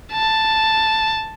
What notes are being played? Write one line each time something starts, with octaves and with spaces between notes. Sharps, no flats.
A5